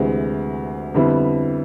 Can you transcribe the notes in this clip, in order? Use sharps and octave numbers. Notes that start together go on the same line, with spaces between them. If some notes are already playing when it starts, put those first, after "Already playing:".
Already playing: D2 C3 E3 G#3
F2 D3 G3 B3 E4